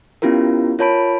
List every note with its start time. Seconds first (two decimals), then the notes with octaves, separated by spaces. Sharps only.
0.22 B3 C#4 E4 F4 G4 A#4
0.79 F4 A#4 C#5 A5 B5 D7